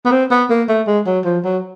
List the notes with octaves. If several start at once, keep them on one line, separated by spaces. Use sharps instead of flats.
B3
C4
B3
A#3
A3
G#3
F#3
F3
F#3